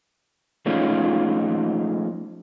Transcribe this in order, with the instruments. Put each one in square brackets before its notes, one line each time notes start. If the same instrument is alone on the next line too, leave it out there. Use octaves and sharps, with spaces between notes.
[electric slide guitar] F3 G#3 A3 C#4 D#4 F4